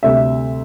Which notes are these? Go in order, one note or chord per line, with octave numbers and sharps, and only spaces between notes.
D2 C3 G3 E5